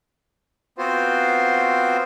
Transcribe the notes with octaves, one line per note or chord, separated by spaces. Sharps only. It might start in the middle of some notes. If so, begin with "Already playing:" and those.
B3 C4 F4 F#4 C5